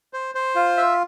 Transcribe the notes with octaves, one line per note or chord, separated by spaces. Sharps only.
C5
C5
F4
E5